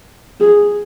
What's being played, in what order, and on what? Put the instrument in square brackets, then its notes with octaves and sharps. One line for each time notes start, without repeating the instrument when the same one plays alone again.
[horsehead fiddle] G#4